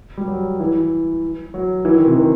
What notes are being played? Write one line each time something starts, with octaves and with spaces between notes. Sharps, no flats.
G3
F#3
E3
F#3
E3
D#3
C3
D#3